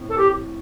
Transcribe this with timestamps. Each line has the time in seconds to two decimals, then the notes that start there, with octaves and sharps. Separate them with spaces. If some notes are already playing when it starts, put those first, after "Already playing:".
Already playing: A2 C4
0.09 A4
0.17 G4